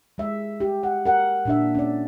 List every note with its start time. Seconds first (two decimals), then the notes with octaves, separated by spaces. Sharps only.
0.18 G#3 E5
0.60 G4
0.83 F#5
1.05 A#4 F#5
1.45 A#2 D4 E5
1.75 C#4 D5